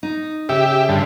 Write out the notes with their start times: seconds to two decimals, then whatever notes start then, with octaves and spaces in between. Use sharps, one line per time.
0.03 D#4
0.49 C#3 G4 E5
0.89 G2 D3